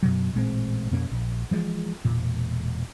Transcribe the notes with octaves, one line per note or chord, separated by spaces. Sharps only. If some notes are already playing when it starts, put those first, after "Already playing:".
F#2 B2 F#3
A1 A#2 G#3 C4
F2 B2 A#3 C#4
A#1
E3 F3 G#3
E1 A#2